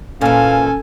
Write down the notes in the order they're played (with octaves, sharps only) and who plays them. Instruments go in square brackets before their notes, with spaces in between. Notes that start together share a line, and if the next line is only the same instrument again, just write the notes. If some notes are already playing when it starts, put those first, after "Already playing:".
[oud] A#2 E3 [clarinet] C#4 [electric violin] A4 G#5 [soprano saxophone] F5